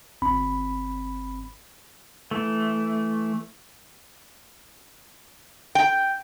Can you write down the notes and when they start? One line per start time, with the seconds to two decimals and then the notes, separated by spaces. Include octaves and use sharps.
0.22 G1 C4 B5
2.31 E3 A3
5.75 G5